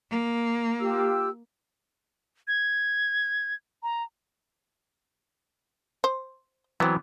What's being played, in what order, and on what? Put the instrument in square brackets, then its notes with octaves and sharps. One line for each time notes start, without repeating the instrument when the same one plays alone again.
[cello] A#3
[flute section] F4 G4 E6
[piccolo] G#6
A#5
[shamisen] C5
[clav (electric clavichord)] E3 F#3 B3 [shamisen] C4 F#4